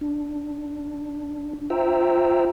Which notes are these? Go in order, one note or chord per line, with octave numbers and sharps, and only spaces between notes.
D4
F4 C5 E5 G5 A#5 E6